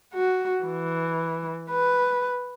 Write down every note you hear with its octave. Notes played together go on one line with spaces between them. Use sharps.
F#4
E3
B4